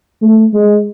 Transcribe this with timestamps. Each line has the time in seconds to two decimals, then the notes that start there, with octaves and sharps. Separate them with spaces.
0.22 A3
0.53 G#3